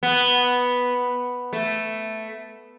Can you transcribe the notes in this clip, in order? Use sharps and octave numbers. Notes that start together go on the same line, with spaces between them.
B3
A3